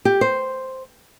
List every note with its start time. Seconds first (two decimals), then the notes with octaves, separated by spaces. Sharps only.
0.05 G4
0.21 C5